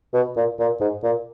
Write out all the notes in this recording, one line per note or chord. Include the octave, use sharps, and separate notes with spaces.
B2
A#2
A#2
G#2
A#2